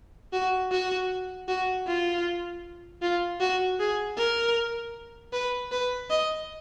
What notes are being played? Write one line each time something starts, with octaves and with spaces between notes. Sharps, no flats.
F#4
F#4
F#4
F4
F4
F#4
G#4
A#4
B4
B4
D#5